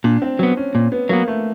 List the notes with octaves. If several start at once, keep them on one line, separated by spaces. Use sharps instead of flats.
A#2 D4
C4
F#3 B3 C4
C#4
A#2
B3
F#3 A#3 B3
A3